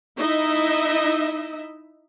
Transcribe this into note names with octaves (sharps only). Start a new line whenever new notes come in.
D#4 E4 D#5 E5